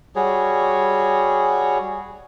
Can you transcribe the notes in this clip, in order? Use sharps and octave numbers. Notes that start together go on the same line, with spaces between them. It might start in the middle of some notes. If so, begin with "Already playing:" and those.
G3 F#4 G#4 C#5